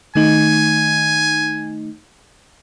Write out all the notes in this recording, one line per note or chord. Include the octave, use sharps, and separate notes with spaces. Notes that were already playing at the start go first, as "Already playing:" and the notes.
D#3 A3 D#4 G#5